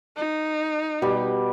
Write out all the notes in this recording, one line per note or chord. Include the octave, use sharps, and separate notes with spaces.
D#4
B2 G3 G4